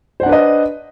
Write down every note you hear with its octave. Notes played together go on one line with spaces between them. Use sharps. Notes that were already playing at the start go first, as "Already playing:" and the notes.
D4 B4 C5 D#5 F#5